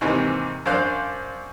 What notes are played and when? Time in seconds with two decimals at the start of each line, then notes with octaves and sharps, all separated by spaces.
0.01 D#2 G#2 C3 E3
0.66 F#2 D4 C5 F5 F#6